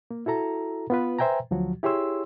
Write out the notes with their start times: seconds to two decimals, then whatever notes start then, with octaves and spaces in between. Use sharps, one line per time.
0.11 A#3
0.26 E4 F#4 A4 A#5
0.90 B3 F4 B4
1.18 B4 C5 E5 G5 G#5 A#5
1.51 D2 F3 F#3 F#4
1.83 E4 G4 G#4 C#5 C6 E6